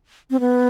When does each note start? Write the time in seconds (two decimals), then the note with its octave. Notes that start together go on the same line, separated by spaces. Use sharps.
0.30 C4
0.40 B3